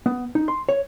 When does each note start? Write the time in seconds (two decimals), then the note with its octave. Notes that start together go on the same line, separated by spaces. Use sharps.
0.06 B3
0.35 D#4
0.48 C6
0.69 C#5